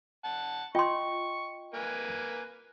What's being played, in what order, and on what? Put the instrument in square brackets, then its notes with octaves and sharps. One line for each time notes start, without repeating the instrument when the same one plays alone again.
[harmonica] F#5 A5
[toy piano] F4 C6 [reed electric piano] D#5 G5 [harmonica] C#6
[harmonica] A#3 B4 G#5